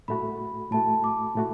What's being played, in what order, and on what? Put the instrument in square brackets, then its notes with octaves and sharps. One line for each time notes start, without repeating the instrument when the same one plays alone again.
[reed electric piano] A2 A3 F#4 [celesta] B5
[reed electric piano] A2 A3 F#4 [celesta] A5
[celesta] D6
[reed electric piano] A2 A3 F#4